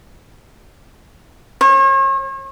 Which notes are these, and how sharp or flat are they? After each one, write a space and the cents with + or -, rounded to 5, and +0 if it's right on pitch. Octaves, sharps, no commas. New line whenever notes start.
C#5 -40